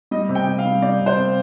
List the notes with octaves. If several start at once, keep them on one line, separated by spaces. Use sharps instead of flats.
G3 D#5
C3
G5
C3
F5
G3
G3 D5
C3
C5
C3